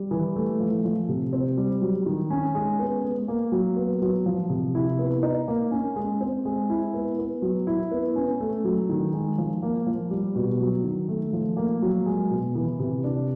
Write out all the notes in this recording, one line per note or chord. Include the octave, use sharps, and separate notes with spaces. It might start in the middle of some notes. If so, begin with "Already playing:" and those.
Already playing: G3
E3
A3
F3
F3
C3
C4
G3
F#3
D#3
C#4
G#3
B3
G#3
A#3
F#3
B3
F#3
F3
C3
E4
B3
D#4
A#3
C#4
G#3
C4
G#3
E4
B3
B3
F#3
E4
B3
C#4
A3
F#3
D#3
G#3
F3
A#3
F3
G3
B2
F#3
D#3
A3
F3
A#3
F#3
G#3
B2
E3
C3
D4